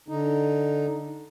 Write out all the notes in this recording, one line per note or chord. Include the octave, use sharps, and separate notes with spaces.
D3 D#4